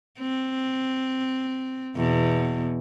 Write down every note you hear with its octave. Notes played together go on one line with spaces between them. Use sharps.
C4
E2 B2